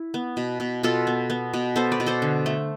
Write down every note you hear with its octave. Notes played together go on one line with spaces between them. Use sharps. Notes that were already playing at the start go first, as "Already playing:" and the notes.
Already playing: E4
B3
B2
B2
B2 F4 A4
B3
B3
B2
B3 A4 C5
B4 D5
B2
A4 C5
D3
A3